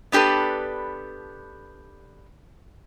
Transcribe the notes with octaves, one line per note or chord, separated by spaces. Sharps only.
B3 D4 G4 A4 B4